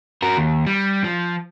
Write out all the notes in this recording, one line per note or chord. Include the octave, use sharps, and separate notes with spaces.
F#4 A#4
D#2
G3
F3